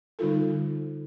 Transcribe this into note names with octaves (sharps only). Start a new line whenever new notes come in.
D3 G3 D#4 F4 A4